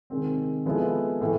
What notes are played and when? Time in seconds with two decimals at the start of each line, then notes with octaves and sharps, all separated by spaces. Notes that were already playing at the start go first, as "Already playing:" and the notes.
0.10 C3 D#3 G#3 C4
0.66 F3 G#3 B3 E4 A4
1.21 A2 E3 A3